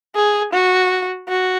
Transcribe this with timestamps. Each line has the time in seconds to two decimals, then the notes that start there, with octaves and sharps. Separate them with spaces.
0.16 G#4
0.53 F#4
1.29 F#4